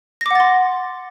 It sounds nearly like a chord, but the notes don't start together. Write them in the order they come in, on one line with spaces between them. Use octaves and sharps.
A#6 D6 F#5 A6 C6